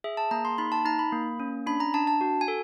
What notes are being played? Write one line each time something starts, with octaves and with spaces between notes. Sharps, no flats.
G#4 E5
A5
A#3 A#5
C6
D#4 B5
A5
D#4 A#5
B5
A#3
C#4
D4 B5
A#5
D4 A5
A5
F#4
G#5
A4